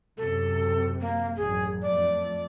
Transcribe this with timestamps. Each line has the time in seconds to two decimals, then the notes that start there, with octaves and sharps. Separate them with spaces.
0.18 F#2 C3 A4
1.01 A#3
1.37 A1 F#2 G#4
1.82 F2 A3 D5